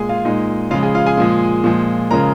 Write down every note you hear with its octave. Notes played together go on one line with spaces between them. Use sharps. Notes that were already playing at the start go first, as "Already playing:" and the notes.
Already playing: A#2 G#3 G#4 G#5
F4 F5
A#2 G#3 D#4 D#5
C#3 F3 G#3 F4 F5
G#4 G#5
F4 F5
G#4 G#5
A#2 F3 G#3
A#2 F3 G#3
C#3 F3 G#3 A#4 A#5